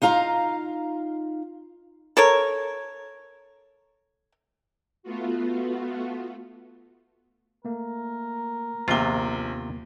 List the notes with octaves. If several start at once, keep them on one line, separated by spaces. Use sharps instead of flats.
D#4 F4 F5 A#5
A4 A#4 C#5
A3 B3 F4 F#4
A3 A#3 A#4
A#1 D#2 C3 A#3 B3 F4 G7